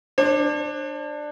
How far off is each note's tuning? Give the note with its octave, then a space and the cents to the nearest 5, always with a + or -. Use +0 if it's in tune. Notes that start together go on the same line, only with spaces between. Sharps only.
D4 +15 C5 +45